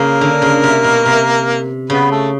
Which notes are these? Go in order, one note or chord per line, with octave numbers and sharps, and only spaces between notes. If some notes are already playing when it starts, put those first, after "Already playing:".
Already playing: C#3 A#3 A#4
D3
C#3
C3
B2
C3
C#3 B3 B4
A3 A4